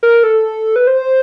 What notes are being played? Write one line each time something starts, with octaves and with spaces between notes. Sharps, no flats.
A#4
A4
B4
C5